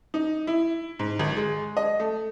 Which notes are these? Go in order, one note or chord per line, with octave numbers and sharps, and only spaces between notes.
D#4
E4
G#2
G#1
G#3
D#5
A3